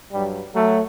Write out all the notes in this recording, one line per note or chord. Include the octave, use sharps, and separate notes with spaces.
G2 F#3 G3
F#3 A3